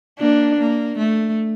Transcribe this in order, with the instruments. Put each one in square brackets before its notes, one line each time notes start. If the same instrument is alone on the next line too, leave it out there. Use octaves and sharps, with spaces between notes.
[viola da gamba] A#3 [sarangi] D4
[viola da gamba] A#3
A3